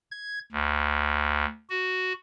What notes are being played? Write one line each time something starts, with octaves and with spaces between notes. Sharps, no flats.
G#6
D2
F#4